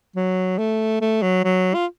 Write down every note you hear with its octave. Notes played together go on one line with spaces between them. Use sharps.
F#3
A3
A3
F#3
F#3
F4